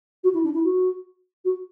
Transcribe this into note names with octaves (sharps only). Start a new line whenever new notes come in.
F#4
E4
D4
E4
F#4
F#4